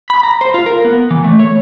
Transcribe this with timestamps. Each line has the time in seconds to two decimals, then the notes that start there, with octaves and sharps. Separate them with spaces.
0.10 B5
0.23 A#5
0.41 C5
0.54 F4
0.66 A#4
0.84 B3
1.11 E3
1.24 A3
1.39 C#5